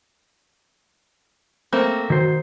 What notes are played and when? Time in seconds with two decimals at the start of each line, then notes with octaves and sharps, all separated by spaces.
1.72 A3 A#3 C4
2.10 D#3 F#4 C5